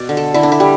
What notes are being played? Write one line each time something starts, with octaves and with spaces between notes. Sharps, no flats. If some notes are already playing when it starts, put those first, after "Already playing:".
Already playing: B2 D5
D3
A4
D3 E4
D4
E4
G3